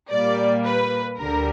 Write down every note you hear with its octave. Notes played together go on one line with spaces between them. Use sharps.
A#2 G3 A#3 D5
B4
D2 D3 G3 A#4